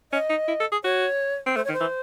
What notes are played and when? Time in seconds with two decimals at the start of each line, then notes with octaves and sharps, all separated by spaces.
0.12 C#4 D#5
0.30 D#4
0.48 E4
0.60 A4
0.72 G#4
0.84 F#4 C#5
1.47 C4
1.56 A3 C5
1.65 C#5
1.69 D#3
1.73 C5
1.80 E3